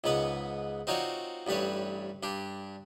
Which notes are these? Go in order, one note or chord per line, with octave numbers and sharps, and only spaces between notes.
C#2 G#2 B3 B4 F#5
C4 D#4 F4 F#4 C#5 D5
A1 G2 G3 B4 C#5
G2 D4 G4